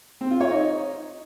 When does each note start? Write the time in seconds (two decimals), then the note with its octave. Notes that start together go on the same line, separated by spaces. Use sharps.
0.21 C4
0.31 F4
0.41 C#5
0.50 D#4